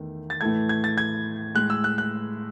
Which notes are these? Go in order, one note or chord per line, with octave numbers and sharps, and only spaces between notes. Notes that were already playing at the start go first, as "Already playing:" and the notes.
Already playing: E2 D#3 A3
A6
A2 E3 A3 G#6
G#6
A6
G#6
A2 G#3 F#6
E6
F#6
F#6